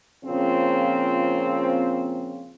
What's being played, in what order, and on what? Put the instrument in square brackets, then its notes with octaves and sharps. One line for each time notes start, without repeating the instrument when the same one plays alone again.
[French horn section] A#2 C#3 F3 C4